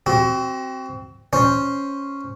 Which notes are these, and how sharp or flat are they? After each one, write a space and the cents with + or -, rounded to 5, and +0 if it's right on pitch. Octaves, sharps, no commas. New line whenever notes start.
C4 +0 F#4 +35
C#4 +0 C5 +0